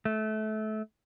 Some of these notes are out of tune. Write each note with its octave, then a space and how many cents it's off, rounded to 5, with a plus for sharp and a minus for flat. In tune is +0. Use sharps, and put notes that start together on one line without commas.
A3 -25